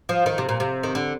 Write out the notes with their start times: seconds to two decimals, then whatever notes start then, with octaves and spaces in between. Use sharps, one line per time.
0.09 F3
0.26 D#3
0.38 C3
0.49 A#2
0.60 C3
0.83 D#3
0.95 D3